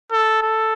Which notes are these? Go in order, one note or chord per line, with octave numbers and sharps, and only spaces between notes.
A4
A4